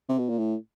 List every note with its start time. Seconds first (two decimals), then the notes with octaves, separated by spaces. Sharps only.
0.09 C3
0.18 B2
0.29 A#2
0.38 A2